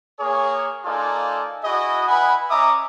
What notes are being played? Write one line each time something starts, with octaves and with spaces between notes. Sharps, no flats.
A#3 G#4 C#5
A#3 D#4 F4 A4 D5 G#5
E4 F#4 G#4 D#5
E4 B4 F#5 G#5 B5
C#4 D#5 E5 A#5 D6 D#6